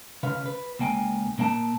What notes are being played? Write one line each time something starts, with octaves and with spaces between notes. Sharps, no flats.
C#3 B4 F5
B4
C#2 A#3 G5 G#5
A#2 A#3 F5 A5